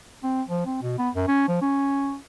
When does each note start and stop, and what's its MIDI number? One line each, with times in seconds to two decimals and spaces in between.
0.23 0.42 60
0.49 0.64 53
0.66 0.79 60
0.82 0.95 47
0.98 1.10 59
1.15 1.27 42
1.28 1.48 61
1.48 1.58 53
1.62 2.16 61